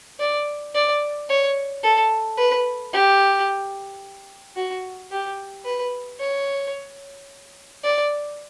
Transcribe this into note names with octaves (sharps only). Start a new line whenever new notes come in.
D5
D5
C#5
A4
B4
G4
F#4
G4
B4
C#5
D5